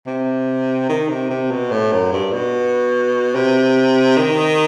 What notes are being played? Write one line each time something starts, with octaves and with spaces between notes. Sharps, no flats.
C3
D#3
C3
C3
B2
A2
F#2
G2
B2
C3
D#3